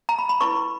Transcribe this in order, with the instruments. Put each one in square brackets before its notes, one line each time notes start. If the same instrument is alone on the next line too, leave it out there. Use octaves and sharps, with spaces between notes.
[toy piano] A#5
B5
B5
E4 B4 C#6